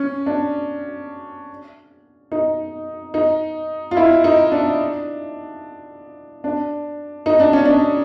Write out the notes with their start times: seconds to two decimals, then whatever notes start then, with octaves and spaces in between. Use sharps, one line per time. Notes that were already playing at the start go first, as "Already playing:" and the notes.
Already playing: C#4
0.26 D4
2.32 D#4
3.14 D#4
3.91 F4
3.97 E4
4.24 D#4
4.52 D4
6.44 D4
7.26 D#4
7.40 D4
7.53 C#4
7.65 D4